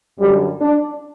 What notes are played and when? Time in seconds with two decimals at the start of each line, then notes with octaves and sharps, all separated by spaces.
0.18 F#2 D3 G3
0.61 D4